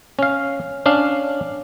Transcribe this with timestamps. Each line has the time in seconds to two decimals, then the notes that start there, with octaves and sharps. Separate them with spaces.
0.19 C#4 F5
0.86 C#4 D4 F5